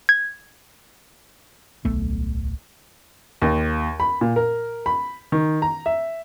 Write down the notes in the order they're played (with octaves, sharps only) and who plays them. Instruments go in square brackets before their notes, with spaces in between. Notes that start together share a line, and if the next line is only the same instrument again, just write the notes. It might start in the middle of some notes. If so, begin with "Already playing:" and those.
[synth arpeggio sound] G#6
[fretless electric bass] D1 B1 A3 B3
[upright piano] D#2
B5
A#2
A#4
B5
D#3
A#5
E5